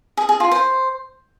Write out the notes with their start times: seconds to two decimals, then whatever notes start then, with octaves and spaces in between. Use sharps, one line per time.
0.17 G#4
0.29 G#4
0.40 F4
0.51 C5